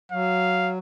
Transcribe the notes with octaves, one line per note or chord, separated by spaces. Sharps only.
F#3 F5